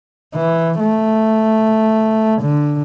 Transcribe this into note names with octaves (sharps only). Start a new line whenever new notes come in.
E3
A3
D3